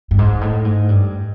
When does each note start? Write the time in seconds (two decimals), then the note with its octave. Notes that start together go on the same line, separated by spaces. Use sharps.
0.11 G2
0.19 G#2
0.41 A2
0.65 G#2
0.89 G2